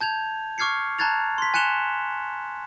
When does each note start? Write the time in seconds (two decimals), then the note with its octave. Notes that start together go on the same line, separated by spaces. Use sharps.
0.01 A5 G6 G#6 F7
0.58 C#6 D6 F6 G#6 C7 C#7
0.99 A5 A#5 F#6 G#6 A6 F7
1.38 C6 B6
1.54 G#5 F#6 C#7 E7 F7 G7